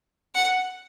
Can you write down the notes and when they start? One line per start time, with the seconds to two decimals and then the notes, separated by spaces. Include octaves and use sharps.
0.35 F#5